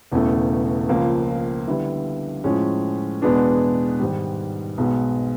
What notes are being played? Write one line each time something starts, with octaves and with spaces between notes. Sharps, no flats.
E1 E2 C#3 E3 A3
C#2 C#3 F3 A#3
D3 G3 B3 E4
A2 F3 G#3 C#4
E2 B2 G#3 B3 D4
G#2 D#3 G3
B1 B2 G#3 B3